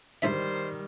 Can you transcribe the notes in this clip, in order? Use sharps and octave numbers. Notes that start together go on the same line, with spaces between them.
G#2 D3 D#3 G3 C5 E5